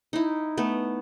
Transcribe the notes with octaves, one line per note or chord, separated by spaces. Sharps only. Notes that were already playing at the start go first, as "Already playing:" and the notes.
D#4 E4
A3 B3